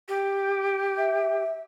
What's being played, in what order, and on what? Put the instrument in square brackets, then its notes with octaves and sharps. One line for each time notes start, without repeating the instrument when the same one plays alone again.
[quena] G4
[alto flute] E5